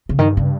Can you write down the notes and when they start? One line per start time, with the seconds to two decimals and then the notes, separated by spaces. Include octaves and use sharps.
0.09 C#3
0.19 G2 D#3
0.37 C#3